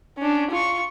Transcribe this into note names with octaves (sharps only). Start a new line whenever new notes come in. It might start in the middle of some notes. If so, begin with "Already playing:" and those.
C#4 D4
F4 C#6